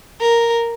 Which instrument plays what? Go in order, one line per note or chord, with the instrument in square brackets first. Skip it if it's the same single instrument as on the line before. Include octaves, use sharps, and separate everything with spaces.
[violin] A#4